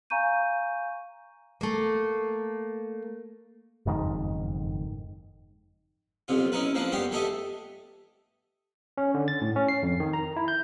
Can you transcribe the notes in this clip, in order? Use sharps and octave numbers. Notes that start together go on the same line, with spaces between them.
F5 G#5 A#5 C#6 G6 D#7
A3 A#3
F#1 F2 G#2 D#3
B1 F2 C3 F4
C#4 D#4 E4 A#4 B4
F3 A#3 C4 D4 B4
G2 B3 G4 G5 C6
E3 A3 G4 A4 D#5 E5
C#4
D3
A6
A2
C#4
C7
F2
D#3
A#5
E4
G6